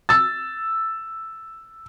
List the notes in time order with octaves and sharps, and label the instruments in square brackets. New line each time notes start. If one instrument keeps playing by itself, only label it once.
[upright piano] E6 A6